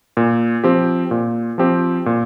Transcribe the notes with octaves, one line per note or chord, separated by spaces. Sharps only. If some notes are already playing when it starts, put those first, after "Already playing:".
A#2
F3 C4 G4
A#2
F3 C4 G4
A#2